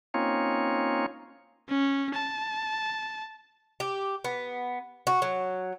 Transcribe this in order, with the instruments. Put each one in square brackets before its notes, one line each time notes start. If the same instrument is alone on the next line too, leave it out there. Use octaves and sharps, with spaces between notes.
[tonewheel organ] A#3 C4 C#4 D#4 F4 C#5
[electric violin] C#4
A5
[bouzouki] G4
B3
F#4
F#3